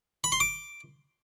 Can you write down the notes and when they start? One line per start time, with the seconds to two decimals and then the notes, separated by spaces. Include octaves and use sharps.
0.24 B5
0.32 C6
0.40 D6